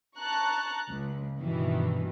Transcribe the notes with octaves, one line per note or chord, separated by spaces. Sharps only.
A5 A#5 C#6 F#6
C#2
G2 B2 D#3 E3